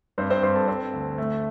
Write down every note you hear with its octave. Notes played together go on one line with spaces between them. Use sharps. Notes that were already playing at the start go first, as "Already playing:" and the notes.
G2 C4 C5
C4 C5
G2 C5 C6
A4 A5
C4
D2
A3